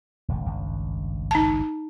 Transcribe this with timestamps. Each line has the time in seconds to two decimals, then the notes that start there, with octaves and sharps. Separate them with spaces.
0.28 E1 A1 D3
0.45 G#1 C#2 G2
1.31 D#4 A5